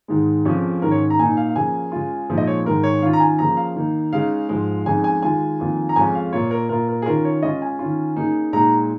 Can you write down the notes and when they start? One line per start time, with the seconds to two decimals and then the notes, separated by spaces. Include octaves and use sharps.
0.08 G#2 D#3 G#3
0.45 F2 C#3 F3 C#4
0.82 G#2 D#3 C#4 A#4
0.91 C#5
1.10 A#5
1.19 A#2 A#3 D#4 G#5
1.37 F5
1.49 F5
1.56 C#3 F3 A#3 G#5
1.92 C#3 G#3 F4
2.30 A#2 F3 G#3 D#4
2.38 D#5
2.47 C#5
2.65 G#2 D#3 G#3 D#4 A#4
2.83 C#5
3.02 D#3 C#4 F4 F5
3.13 A#5
3.20 G#5
3.39 C#3 F3 A#3 A#5
3.57 F5
3.76 D#3 A#3 D#4
4.13 C#3 G#3 D#4 F5
4.49 G#2 F3 G#3
4.86 F2 C#3 G#3 D#4 G#5
5.04 G#5
5.22 D#3 G#3 F4 G#5
5.60 F2 D#3 A#3 F4
5.89 A#5
5.96 F2 C#3 G#3 C#4 F4 G#5
6.15 F5
6.33 A#2 A#3 F4 C#5
6.51 A#4
6.69 A#2 A#3 F4 A#4
6.89 A#4
7.02 G#4
7.06 D#3 C#4 F4 A#4
7.25 C#5
7.43 C#3 G#3 C#4 F4 D#5
7.62 G#5
7.79 D#3 C#4 F4
8.16 C#3 A#3 D#4
8.53 A#2 G#3 D#4 A#5